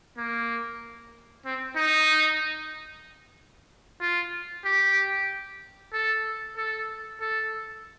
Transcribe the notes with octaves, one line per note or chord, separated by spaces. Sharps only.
A#3
C4
D#4
F4
G4
A4
A4
A4